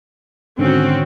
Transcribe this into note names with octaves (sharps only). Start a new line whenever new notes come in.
G#2 D3 D#3 C4 C#4 F#4